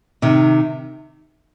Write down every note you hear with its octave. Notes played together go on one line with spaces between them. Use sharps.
C3 D#3